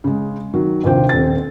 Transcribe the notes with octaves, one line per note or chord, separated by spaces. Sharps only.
C#3 G#3
D#3 F#3
A#1 D#2 C3 F4 C5 G5
D#1 C4 A6